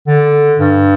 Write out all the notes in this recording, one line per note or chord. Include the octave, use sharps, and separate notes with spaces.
D3
G2